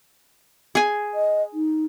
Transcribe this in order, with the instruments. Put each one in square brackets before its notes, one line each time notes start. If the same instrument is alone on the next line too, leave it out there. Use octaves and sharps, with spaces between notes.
[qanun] G#4 G#5
[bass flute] D#5
D#4